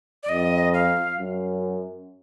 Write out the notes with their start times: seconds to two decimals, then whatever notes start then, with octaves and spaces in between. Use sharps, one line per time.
0.23 D5
0.28 F2 D#5
0.74 F5
1.18 F#2